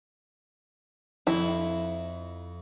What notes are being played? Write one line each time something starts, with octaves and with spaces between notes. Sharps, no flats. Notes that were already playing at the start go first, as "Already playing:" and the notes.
F2 E4